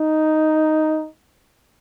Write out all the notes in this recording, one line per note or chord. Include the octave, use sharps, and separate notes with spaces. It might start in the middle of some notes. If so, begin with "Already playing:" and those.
Already playing: D#4